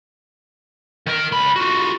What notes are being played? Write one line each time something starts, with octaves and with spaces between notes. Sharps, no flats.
D#3 A#4
C#2 B5
F4 F#4